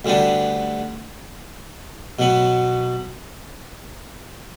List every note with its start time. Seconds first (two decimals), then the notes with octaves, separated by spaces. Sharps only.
0.05 D2 D3 G3 B3 D4
2.19 B2 F#3 B3